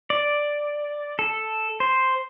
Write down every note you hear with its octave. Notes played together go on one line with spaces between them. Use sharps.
D5
A4
C5